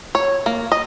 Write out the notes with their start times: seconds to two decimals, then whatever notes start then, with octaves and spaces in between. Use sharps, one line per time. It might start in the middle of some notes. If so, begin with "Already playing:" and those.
0.15 C#5
0.46 A#3
0.72 D#5